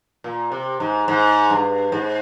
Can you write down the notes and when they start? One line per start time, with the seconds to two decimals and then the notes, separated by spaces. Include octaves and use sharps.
0.24 A#2
0.52 C3
0.80 G#2
1.08 G#2
1.50 G2
1.92 G#2